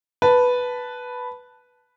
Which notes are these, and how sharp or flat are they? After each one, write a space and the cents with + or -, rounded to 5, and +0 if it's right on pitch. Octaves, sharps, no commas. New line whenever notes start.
B4 +0 A5 +0